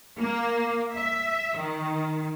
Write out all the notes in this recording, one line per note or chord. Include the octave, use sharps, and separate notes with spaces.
A#3
E5
D#3